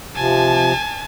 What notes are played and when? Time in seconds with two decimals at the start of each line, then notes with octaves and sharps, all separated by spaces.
0.16 C3 F3 G#5 A5